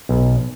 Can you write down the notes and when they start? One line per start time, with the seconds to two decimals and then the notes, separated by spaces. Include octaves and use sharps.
0.09 B1